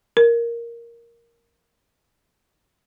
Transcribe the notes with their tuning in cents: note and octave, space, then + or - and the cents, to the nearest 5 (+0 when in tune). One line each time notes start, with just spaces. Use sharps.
A#4 +0